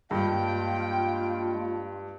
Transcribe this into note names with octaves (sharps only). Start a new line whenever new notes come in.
G2 G#3 A#3 D4 F4 G5